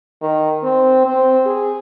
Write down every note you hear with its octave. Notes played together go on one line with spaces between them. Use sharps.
D#3
C4
C4
G#4